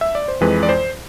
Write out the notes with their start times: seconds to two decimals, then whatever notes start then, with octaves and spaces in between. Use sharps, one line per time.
0.01 E5
0.15 D5
0.28 C5
0.41 F2 E3 G#3 B4
0.63 D5
0.69 C5